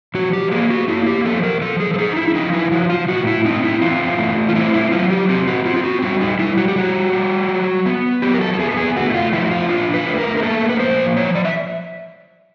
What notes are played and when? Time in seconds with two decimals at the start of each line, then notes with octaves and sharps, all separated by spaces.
0.15 F3 F#4
0.33 G4
0.51 A#3 G#4
0.70 F#4
0.88 A#3 E4
1.07 G4
1.25 F3 A4
1.43 A#4
1.61 F3 A4
1.80 G#4
1.94 A4
1.99 D#4 G#4
2.17 E4
2.28 E4
2.35 F3 D#4
2.53 E4
2.71 F3 F#4
2.90 F4
3.09 A2 F#4
3.27 E4
3.45 C4 D#4
3.64 E4
3.82 E3 F4
4.19 A3
4.49 F4
4.55 C4 E4
4.74 E4
4.92 F#3 F4
5.10 G4
5.29 C4 G4
5.47 F#4
5.66 C4 F4
5.76 F4
5.84 F#4
6.02 G3 F#4
6.20 D#4
6.39 G3 E4
6.57 F#4
6.68 G4
6.76 G3 F#4
7.13 G3
7.49 F#3
7.86 B3
8.22 F#3 G4
8.34 A#4
8.41 A4
8.54 A4
8.59 B3 G#4
8.71 A4
8.77 G#4
8.96 A3 F#4
9.10 E4
9.14 F4
9.33 F3 E4
9.45 F#4
9.51 F4
9.69 D4 F4
9.94 B4
10.06 A3
10.18 A#4
10.37 A#4
10.43 A#3 A4
10.69 B4
10.79 F3 C5
11.17 F3 C#5
11.35 D5
11.45 E5